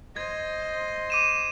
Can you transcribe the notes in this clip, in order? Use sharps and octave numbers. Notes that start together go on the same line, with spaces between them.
C5 D#5 G#6
D6 D#7 E7